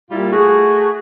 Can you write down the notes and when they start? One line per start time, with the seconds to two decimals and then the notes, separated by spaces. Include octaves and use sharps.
0.11 A#2 G3 E4 F4
0.32 A3 F#4 G#4